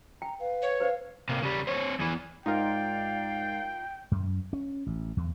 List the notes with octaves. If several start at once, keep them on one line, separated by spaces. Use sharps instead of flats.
G5 A#5
B4 F5
C#5
B4 C5 F5
C3 A#3
C#3 G3
C4 C#5
E2 E3
G#2 D#4 F4 A#4 D5 F5 G5
F#2
C#4
A1
E2